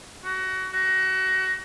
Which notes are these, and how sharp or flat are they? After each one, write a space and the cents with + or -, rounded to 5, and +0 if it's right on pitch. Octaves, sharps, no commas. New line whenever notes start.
F#4 +25
F#4 +30